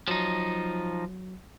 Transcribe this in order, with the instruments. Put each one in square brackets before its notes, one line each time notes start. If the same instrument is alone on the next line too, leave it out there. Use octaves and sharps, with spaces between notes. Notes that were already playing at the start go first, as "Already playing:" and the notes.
[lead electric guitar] F3 D#4 [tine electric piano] F#3